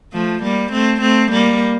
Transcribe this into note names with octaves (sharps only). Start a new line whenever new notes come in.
F3 A3
G3 A#3
A3 C4
A3 C4
G3 A#3